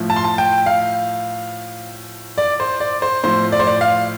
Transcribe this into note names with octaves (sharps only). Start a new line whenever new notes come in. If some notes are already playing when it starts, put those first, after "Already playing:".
Already playing: A2 F3
A5
C6
A5
G5
F5
D5
C5
D5
C5
A2 F3 C5
D5
C5
D5
F5